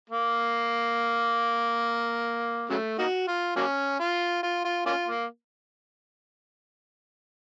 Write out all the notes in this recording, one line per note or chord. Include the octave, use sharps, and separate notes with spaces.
A#3
C#3 F#3 A3
A#3 D#4 F#4
F4
F#3 A#3 C#4
F4
F4
F4
A#3 C#4 F4
A#3